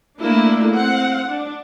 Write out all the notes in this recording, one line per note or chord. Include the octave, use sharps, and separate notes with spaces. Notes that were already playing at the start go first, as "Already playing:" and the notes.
A3 A#3 D4 E4
C4 F#5
D4